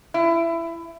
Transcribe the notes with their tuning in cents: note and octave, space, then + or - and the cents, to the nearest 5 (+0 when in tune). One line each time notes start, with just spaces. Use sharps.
E4 +20